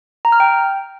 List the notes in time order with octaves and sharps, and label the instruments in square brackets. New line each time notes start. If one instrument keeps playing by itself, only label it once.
[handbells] A#5
F6
G5